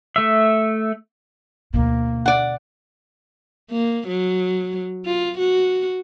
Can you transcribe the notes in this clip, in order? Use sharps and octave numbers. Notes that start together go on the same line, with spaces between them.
A3 E5
D2 B2 A#3
D5 F#5
A#3
F#3
F4
F#4